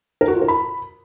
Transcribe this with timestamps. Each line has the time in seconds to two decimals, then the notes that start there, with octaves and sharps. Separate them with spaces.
0.21 A#4
0.28 F#4
0.35 F4
0.42 A#4
0.48 B5